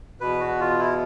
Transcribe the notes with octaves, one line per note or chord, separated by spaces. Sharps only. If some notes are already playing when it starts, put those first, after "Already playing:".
E2 B2 B4
F#4
F4
E4